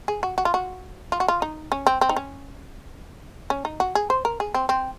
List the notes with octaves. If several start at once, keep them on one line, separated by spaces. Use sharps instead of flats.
G#4
F#4
F#4
F4
F#4
F4
F#4
F4
D#4
C#4
C4
C4
D#4
C#4
C#4
D#4
F#4
G#4
C5
A#4
G#4
C4
C4